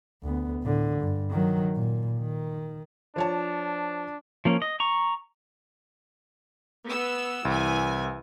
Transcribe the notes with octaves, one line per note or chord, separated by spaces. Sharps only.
D2 B3
A2 D3
G2
D#3 F#3
A#2
D#3
F3 D4 C#5 A5
F3 A#3 C#4
D#5
A#5 C#6
B3 E6
C2 E3 G#5